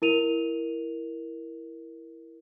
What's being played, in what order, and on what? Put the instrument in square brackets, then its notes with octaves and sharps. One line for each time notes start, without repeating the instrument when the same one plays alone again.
[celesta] E4 A#4 D#7 F7